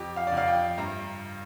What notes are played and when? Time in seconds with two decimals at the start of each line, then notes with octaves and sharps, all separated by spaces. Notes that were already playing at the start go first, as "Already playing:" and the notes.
Already playing: F2 G4
0.16 F5
0.27 F2 D5
0.37 F5
0.47 G5
0.78 G2 A#5